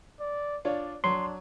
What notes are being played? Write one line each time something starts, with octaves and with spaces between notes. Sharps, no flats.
D5
D4 F4 C#5 D5
F#3 D4 C6